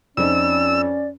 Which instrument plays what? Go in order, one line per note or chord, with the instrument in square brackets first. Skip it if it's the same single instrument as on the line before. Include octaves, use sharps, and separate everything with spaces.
[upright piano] F2 F3 D#4 [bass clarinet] C#4 [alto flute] D5 [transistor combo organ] E6